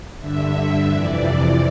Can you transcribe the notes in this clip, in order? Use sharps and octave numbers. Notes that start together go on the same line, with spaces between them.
G2 D3 E5
F2 C3 E3 D5